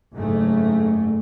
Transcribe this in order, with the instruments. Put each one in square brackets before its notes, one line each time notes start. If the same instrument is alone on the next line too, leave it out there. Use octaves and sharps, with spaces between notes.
[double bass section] F#1 G#2 A3